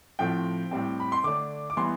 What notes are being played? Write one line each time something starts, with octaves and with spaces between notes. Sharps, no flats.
A2 F3 A3 C4 G5
A2 G3 C4
B5
C6
D3 A3 D4 D6
D6
E3 G3 B3 C6